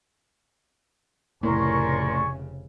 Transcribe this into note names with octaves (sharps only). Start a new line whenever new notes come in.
F1 A2 C#3 A#4 D5 G#5 C6 C#6